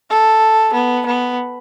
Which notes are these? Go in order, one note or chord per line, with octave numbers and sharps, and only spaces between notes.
A4
B3
B3